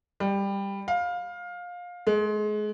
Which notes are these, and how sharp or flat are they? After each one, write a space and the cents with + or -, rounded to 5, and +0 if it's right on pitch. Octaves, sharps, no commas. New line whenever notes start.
G3 +15
F5 +20
G#3 +30